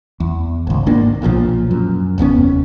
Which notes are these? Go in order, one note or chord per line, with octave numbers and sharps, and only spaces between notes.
E2
G#1 C#2
G#1 A#3 D4
B1 A#2 D3 F3
F#2
F1 D#2 B3 C#4